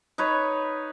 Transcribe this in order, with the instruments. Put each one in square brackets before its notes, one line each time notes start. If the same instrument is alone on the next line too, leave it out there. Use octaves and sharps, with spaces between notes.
[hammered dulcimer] D#4 B4 C#5